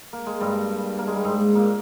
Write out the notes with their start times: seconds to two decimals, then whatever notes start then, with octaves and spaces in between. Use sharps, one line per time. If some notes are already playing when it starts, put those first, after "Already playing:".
0.13 A#3
0.26 G#3
0.41 G2 G3
0.98 A#3
1.07 G#3
1.16 G3
1.24 G#2 G#3
1.55 A#2 A#3